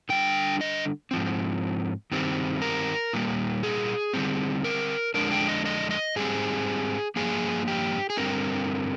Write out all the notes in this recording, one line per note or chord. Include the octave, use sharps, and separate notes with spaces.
D3 G3 D4 G5
D#5
G#2 F3 C4
G2 D#3 G3 C4
A#4
A#2 G3 A#3
G#4
D3 G3 C4
A#4
F2 D3 G#3 D4 A#4
G5
D#5
D#5
D#5
G#2 G3 C4 G#4
G2 F3 A#3 G#4
G4
G#4
G2 D3 G3 C4 A#4